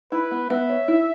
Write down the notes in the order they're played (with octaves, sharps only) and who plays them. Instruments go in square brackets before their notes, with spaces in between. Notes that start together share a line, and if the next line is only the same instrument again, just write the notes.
[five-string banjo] E4 [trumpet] B4
[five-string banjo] B3
[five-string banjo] B3 [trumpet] E5
[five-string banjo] C#5
E4